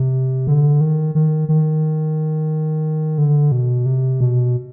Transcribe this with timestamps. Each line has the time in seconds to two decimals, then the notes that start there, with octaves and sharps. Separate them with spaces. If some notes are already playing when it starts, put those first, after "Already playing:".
Already playing: C3
0.47 D3
0.81 D#3
1.15 D#3
1.49 D#3
3.18 D3
3.52 B2
3.86 C3
4.20 B2